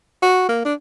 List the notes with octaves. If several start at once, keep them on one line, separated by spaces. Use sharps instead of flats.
F#4
A#3
D4